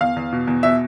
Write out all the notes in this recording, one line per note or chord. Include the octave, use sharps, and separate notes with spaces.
E2 F5
E2
B2
E2
B2 E5